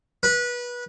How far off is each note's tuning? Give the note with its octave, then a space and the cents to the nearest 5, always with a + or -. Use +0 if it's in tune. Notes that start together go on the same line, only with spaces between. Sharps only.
B4 -25